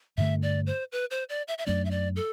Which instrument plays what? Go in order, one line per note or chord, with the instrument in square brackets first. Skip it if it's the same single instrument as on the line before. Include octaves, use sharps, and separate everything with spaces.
[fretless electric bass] G2 D3 A3 [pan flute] E5
[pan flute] D5
C5
B4
C5
D5
E5
E5
[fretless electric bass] F#2 F#3 A3 D4 [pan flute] D5
[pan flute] E5
D5
A4